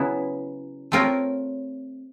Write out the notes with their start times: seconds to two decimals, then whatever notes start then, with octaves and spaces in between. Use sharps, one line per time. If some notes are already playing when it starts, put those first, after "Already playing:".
Already playing: C#3 F#3 B3 E4
0.92 A3 C4 F4 A#4 C#5